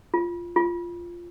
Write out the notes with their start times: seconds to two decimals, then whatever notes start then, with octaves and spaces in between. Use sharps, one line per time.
0.14 F4
0.56 F4